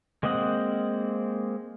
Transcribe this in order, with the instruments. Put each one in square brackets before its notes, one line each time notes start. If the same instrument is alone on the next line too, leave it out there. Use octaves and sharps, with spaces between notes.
[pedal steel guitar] G#3 A#3 C4 D#5 F#5